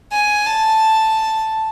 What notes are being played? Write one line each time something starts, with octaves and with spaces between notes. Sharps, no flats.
G#5
A5